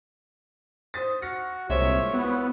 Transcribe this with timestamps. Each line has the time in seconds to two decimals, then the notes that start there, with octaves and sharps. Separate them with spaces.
0.94 C5 D#6 A6
1.22 F#4 F6 A#6 C#7
1.70 C2 A#2 D#3 G#3 C4 C#5 E5
2.14 B3 E4 F#4